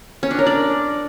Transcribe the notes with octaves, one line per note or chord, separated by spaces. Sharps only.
C#4
D4
A#4
D5